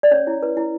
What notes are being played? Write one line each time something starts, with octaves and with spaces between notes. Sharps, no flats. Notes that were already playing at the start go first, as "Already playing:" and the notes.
D5
C#4 C#5
E4
B4
E4